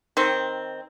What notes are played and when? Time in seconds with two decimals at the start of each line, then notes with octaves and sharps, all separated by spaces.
0.17 D#3 C4